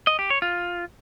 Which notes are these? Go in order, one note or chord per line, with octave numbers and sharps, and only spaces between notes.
D#5
G4
C#5
F4